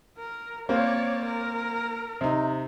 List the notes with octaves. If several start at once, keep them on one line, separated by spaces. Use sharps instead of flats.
A#4
A#3 C4 C#5 D5
A#4
C3 D#4